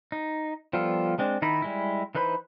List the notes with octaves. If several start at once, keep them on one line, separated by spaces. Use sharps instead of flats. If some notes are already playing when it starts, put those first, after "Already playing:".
D#4
F3 G3 B3 F4 A4
G#3 C4 D4
D#3 D#4 E4 B5
G3 G#3 E4
E3 D#4 B4 C5 B5